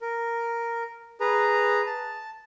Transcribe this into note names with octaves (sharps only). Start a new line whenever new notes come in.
A#4
G#4 B4 A#5
A5